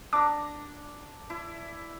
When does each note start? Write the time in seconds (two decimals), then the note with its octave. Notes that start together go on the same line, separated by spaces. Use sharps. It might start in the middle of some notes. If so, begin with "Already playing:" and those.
0.13 D4 A#5 D6
1.30 E4